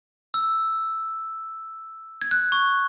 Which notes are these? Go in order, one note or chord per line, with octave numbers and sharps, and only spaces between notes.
E6
G#6
F#6
C#6